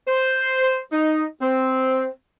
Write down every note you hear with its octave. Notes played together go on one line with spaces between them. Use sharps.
C5
D#4
C4